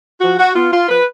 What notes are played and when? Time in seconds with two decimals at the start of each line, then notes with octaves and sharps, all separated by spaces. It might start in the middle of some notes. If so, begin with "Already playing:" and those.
0.21 F3 F#4
0.39 F#4
0.55 B3 F4
0.72 F4
0.88 F3 B4